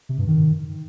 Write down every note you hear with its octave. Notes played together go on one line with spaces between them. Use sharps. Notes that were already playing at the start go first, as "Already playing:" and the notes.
C3
G2
D#3